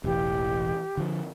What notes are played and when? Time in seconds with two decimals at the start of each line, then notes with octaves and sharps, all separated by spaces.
0.04 E1 A1 E3 G4
0.97 D3 F3